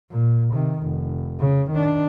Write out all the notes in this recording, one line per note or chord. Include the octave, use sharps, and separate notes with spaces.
A#2
C3 D#3
F1
C#3
D#3 D4